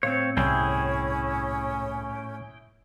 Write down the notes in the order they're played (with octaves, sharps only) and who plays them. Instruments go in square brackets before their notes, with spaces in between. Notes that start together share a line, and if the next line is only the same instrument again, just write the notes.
[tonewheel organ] A2 [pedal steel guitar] C4 C#5 [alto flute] F5
[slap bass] C2 G2 [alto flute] C#4 [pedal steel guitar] E4 G#4 G5